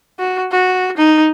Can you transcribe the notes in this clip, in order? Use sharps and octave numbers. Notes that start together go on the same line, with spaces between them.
F#4
F#4
D#4